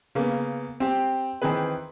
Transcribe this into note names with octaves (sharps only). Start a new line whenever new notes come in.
C#3 A#3 B3
C4 G4
D#3 E3 C4 G#4 B4